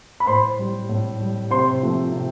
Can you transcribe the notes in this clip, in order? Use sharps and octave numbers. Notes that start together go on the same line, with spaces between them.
B5
A2 C5 C6
G3
A2
G3
C3 C5 C6
F3 A3
C3